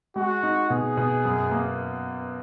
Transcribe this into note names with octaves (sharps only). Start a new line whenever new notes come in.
G#3 F#4
D#4
B2 G#4
B2
F#2
A#3